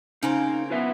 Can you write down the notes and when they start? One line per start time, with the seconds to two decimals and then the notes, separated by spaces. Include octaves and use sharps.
0.23 C#3 A#3 C4 C#4 D#4
0.70 B3 F4 B4 E5